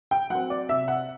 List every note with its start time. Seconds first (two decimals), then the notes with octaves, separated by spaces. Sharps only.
0.11 G5
0.30 F#3 C4 F#5
0.50 D5
0.69 C3 E5
0.88 F#5